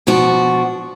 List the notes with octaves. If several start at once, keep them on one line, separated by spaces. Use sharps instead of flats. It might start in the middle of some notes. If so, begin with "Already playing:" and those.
B2 F3 D4 F#4